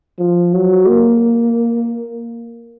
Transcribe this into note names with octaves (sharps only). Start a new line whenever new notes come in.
F3
F#3
A#3